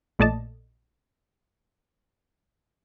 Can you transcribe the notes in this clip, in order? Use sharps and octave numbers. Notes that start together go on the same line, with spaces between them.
A#1 A#2 A3 D5 D#5 A5